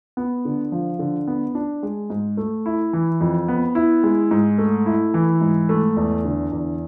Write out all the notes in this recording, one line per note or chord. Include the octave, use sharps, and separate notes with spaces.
B3
D3
F3
D3
B3
D4
G#3
G#2
A3
E4
E3
F2
B3
E4
G#3
G#2
A3
E4
E3
G#2
A3
E2
D3
E2